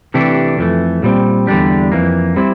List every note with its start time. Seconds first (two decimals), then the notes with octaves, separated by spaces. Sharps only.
0.14 C3 E3 A3 D4 G4
0.59 F2 E3 A3
1.03 A#2 G3 C4
1.47 E2 D3 G3 D4 G4
1.92 F2 E3 A#3
2.36 G3 C4 E4